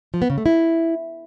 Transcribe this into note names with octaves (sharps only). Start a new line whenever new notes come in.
F3
B3
C#3
A3
E4